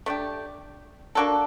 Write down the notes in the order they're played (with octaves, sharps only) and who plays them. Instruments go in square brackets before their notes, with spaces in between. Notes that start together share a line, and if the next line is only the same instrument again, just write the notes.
[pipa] A3 D4 G4
A#3 D4 F#4 A4